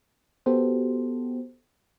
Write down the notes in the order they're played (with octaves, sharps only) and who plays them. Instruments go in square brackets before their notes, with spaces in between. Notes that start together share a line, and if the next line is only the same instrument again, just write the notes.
[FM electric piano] B3 F#4 G4 A4 C5